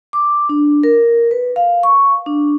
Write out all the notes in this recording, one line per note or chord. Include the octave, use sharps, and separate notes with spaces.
D6
D4
A#4
B4
F5
C#6
D4